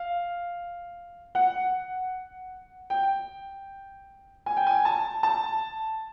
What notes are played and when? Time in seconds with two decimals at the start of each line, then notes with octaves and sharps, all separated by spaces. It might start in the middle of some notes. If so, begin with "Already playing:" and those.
Already playing: F5
1.35 F#5
2.90 G5
4.46 G#5
4.57 G5
4.67 G#5
4.85 A5
5.23 A5